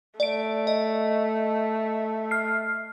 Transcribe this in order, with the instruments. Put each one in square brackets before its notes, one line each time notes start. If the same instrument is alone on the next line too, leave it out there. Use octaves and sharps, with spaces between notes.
[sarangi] A3 [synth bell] D5 D7
[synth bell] D#5
F6 C7